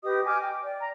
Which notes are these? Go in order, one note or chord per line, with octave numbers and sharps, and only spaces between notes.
G4 B4 D#5 D#6
D#5 G#5 D6 F6
G5
D5
A#5